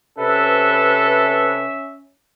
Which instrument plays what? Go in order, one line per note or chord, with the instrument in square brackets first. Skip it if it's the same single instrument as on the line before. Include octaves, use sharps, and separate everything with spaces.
[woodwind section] C3 B4 [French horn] C#4 [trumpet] A4 [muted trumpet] E5